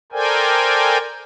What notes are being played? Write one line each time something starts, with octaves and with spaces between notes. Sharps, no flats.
A4 A#4 C5 D5 G5 G#5